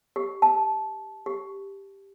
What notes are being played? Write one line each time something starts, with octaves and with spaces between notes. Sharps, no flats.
G4
A5
G4